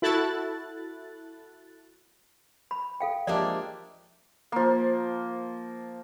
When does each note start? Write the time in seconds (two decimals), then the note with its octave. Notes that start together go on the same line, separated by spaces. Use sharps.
0.02 E4 F#4 A4 F#6 A6
2.71 B5
3.00 A4 F5 G5
3.27 F3 G#3 A#3 D4 G4 D5 E5
4.52 F3 A#3